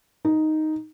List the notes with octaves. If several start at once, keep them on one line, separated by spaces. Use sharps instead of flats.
D#4